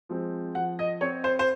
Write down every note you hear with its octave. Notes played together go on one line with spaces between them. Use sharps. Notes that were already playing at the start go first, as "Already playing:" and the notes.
F3 G#3 C4
F3 F#5
D#5
C4 C#5
C5
C5